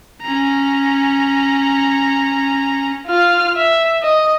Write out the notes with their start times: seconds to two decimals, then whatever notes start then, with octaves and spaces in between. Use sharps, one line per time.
0.22 C#4 A#5
3.07 F4 F6
3.56 E5
4.02 D#5